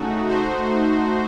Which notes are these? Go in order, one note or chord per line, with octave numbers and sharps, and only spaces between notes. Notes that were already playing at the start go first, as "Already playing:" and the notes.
Already playing: C#3 A3 D#4 F#4
A3 D#4 F#4 C5